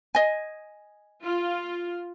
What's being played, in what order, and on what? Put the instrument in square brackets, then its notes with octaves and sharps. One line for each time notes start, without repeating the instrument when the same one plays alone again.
[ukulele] D#5 G#5
[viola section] F4